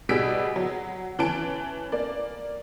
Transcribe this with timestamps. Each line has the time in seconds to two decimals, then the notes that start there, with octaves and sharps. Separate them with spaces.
0.09 B2 G3 G#4 E6 B6 D7
0.56 F#3
1.19 E3 C#4 A5 D7
1.92 A#3 D5